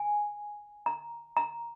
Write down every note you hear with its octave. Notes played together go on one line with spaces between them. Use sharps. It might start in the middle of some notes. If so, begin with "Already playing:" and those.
Already playing: G#5
A#5
A#5